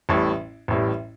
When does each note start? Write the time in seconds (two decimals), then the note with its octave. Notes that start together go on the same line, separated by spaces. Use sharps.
0.09 A1 A2 G3
0.68 A1 A2 G3